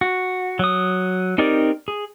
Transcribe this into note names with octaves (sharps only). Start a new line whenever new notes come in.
F#4
F#3 D#6
C4 D#4 G4 A#4 D5
G#4